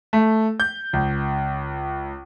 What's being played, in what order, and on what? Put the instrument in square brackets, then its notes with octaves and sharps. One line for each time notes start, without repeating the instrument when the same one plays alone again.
[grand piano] A3
G6
C#2